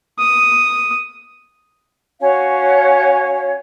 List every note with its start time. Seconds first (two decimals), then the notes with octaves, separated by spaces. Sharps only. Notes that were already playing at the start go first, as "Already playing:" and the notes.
0.19 D#6
2.20 C#4 F#4 C#5 F5